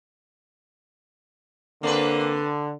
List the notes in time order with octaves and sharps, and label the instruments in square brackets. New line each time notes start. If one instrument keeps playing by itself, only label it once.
[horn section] D3 [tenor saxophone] A#3 [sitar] C4 D4 B4